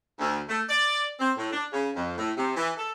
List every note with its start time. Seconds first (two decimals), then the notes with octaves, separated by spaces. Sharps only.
0.19 D2
0.48 A3
0.69 D5
1.20 C4
1.37 A2
1.52 D4
1.71 C#3
1.96 F2
2.17 A2
2.37 C3
2.57 E3
2.77 A4